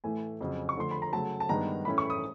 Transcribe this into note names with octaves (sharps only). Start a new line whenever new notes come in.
A2 E3 A3 G#5
F2 C#3 F#3
C#6
D3 F3 A3 C6
B5
A#5
C#3 F#3 A3 A5
A5
G2 D#3 G#3 B3 D4 A#5
A2 E3 A3 C#4 B5
C#6
D#6